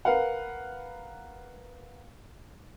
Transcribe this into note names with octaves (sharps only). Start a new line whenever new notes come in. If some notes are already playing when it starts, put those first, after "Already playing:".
A#4 B4 F5 F#5